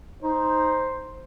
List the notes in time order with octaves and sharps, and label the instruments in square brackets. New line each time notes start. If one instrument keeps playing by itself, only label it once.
[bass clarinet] D#4 [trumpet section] C5